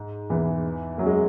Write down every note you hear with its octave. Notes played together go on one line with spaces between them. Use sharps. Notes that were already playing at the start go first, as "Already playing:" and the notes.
Already playing: G#2
E2 E3
F#2 F#3
G#3